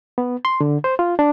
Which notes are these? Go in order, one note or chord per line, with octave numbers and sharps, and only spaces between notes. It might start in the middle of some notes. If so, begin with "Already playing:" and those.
B3
C6
D3
C5
F4
D4